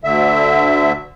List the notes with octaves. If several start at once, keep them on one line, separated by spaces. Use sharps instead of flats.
D2 D3 E5